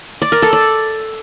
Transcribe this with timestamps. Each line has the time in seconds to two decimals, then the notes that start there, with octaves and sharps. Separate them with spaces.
0.22 D5
0.32 A#4
0.42 A4
0.53 D5